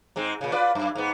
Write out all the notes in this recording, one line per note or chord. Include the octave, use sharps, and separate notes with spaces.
G#2 G#3 C4
A#2 C#3
F4 B4 D5
F#2
G#2 B3